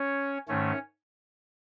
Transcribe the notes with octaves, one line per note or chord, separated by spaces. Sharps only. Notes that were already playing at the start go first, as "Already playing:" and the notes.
Already playing: C#4 C#5
G#2 D#3 A3 C#4 C#5